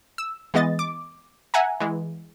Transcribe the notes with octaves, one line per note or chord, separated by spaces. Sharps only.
E6
E3 G#3 B3 D#5 A6
D6
E5 F#5 G#5 A#5
E3 G#3